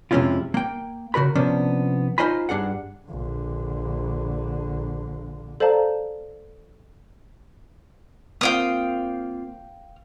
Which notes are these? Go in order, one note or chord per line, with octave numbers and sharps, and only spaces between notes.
F2 C3 G#3 C#4 E4 F4
A#3 G5
C#3 F#4 A#4 B5
C3 F3 B3 C#4 D4
D#4 F4 C5 D#5 G#5 B5
G2 D4 G#4 F#5
A#1 D3
A4 C5 D5 F5 A5 A#5
A#3 C4 F4 F5 G5 D#6